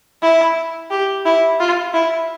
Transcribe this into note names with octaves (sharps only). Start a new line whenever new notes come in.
E4
G4
E4
F4
E4